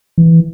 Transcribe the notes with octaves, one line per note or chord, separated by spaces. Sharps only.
E3